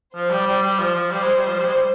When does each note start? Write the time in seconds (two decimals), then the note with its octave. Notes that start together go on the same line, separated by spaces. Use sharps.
0.15 F3 C5
0.31 G3
0.47 G3
0.63 G3
0.79 F3
0.95 F3
1.11 G3 C5
1.23 G#3
1.35 G3
1.47 F3
1.60 G3
1.67 G#3
1.74 G3